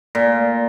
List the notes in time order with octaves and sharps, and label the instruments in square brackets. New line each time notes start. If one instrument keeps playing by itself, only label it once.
[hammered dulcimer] A#2